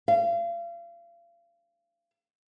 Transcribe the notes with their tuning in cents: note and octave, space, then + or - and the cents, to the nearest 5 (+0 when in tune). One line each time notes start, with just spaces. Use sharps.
F5 -35